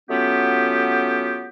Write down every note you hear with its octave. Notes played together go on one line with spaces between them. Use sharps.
F#3 A3 B3 C#4 F4 G4